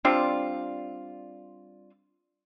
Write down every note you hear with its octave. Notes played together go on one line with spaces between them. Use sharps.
G3 C4 D4 F4